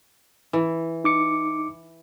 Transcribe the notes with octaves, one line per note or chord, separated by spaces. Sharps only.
E3
D#4 D6 C#7